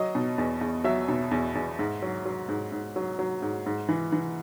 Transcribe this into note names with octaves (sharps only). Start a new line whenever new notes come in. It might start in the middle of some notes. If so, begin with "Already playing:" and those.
Already playing: F#3 D#5
B2
E2
E2
F#3 E5
B2
E2
E2
G#2
F#3
F#3
G#2
G#2
F#3
F#3
G#2
G#2
E3
E3